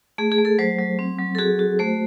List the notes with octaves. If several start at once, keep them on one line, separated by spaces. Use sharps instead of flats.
A3 G#4
G#4
A3
A4
F#3 C5
F#3
C4
F#3
A4
F#4 G#4
F#4
A3 C5